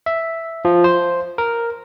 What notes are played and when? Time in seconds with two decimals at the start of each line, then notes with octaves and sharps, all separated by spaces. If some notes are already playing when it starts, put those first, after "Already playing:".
0.06 E5
0.65 F3
0.84 C5
1.38 A#4